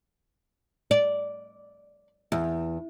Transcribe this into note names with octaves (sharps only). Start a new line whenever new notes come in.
D5
E2